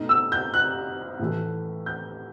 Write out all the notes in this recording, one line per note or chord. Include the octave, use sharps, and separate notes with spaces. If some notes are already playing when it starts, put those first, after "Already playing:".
Already playing: B2 A3 D#4
E6
G6
F#6
A2 E3 A3
G6